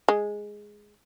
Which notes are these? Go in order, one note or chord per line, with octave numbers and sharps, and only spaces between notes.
G#3